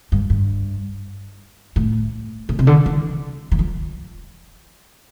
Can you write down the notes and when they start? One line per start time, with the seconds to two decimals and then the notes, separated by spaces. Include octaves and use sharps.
0.12 G2
0.30 G2
1.76 A2
2.49 A#2
2.59 C3
2.67 D3
2.86 E3
3.51 E3
3.59 F3